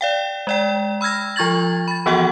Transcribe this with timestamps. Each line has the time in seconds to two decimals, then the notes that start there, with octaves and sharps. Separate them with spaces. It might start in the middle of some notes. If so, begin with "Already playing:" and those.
0.01 D5 F5 G5
0.47 G#3 D5 G5
1.01 B5 E6 F6 G#6 A#6
1.36 F3 F4 C#6 G#6 A6 F#7
1.88 B5 A6
2.06 E3 F3 B3 F#4 F#5 G5